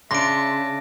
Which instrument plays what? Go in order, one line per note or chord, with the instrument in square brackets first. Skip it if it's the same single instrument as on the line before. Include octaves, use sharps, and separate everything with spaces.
[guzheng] C#3 D4 [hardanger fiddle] E5 A5 [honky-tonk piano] C6 [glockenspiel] A#6 D7